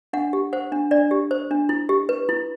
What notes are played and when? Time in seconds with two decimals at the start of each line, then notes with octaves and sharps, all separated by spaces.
0.13 D4 F#5
0.33 G4
0.53 C5 F#5
0.72 D4
0.91 D4 D5
1.11 G4
1.31 C5
1.51 D4
1.69 E4
1.89 G4
2.09 B4
2.29 E4